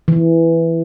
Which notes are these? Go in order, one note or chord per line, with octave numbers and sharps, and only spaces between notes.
E3